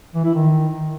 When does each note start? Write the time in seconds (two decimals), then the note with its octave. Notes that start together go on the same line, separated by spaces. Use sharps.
0.15 E3
0.25 E4
0.34 D#3